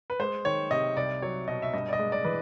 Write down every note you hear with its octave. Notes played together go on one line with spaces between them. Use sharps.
B4
G#3 C5
D#3 C#5
C3 D#5
C2 D5
F#3 C#5
B2 D#5
E5
G2 D#5
D5
D#5
G#3
D5
E3 B4